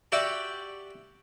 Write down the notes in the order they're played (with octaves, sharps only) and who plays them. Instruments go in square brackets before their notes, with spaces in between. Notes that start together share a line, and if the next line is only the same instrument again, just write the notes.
[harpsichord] F#4 G4 D5 E5 G5